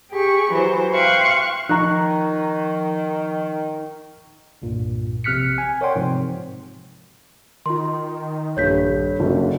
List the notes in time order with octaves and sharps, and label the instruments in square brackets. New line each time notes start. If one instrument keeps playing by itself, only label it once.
[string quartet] G4 G#4 C#6
E3 F#3 C5
E5 F5 G5 C6 C#6 F#6
[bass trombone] D#3 [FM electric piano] F3 [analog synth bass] D#4 [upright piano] A#5 C#6 F#6
[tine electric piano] C2 G2 A#2
A#1 C3 F6 F#6 B6 C#7
G#5
A#4 C#5 D5 F#5 G5 C6
G#2 C3 F3 C4
[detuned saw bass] D#3 [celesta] F4 C6
[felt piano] D#1 G2 G3 [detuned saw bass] A#1 [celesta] C#5 G6 B6
[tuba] F#1 [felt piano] D2 [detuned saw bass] D3